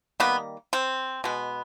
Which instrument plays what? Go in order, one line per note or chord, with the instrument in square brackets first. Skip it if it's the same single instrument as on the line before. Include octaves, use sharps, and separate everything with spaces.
[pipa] D#3 G3 A#3 B3
C4
B2 G#3 B3